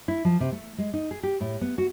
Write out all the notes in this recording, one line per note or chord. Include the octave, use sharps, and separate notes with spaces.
E4
F3
C3
A3
G#3
D#4
G#4
G4
A2
B3
F#4